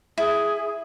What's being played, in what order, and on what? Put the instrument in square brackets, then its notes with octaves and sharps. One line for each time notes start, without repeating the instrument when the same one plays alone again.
[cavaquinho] E4 [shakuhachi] G#4